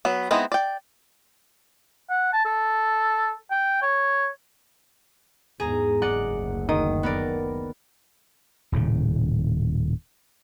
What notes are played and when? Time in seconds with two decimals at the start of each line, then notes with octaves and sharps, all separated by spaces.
0.05 F#3 B3
0.31 G#3 B3 C4 D#4 E4
0.52 D5 G5
2.10 F#5
2.33 A5
2.45 A4
3.51 G5
3.82 C#5
5.60 E2 G#2 G#4 A#5
6.02 F#1 D2 D5 D#5 F#5
6.69 D#3 D#6
7.03 B3 A#4 D5
8.72 D#1 A2 C#3